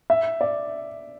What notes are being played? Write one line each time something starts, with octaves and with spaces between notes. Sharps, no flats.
E5
D5